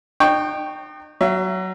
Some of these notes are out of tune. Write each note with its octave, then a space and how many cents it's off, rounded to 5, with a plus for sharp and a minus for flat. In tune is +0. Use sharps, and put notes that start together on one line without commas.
D#4 -40 G5 +0 C#6 +0
F#3 +15 E5 +35